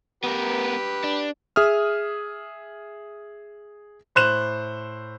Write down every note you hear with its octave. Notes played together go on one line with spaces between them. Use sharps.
B3 G4 A#4 B4
D4
G#4 E5 D#6 F6
A2 C5 F#6 E7